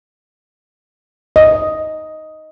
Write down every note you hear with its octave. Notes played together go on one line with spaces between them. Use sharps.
D#5